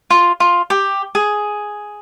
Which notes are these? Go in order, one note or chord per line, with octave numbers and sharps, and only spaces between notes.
F4
F4
G4
G#4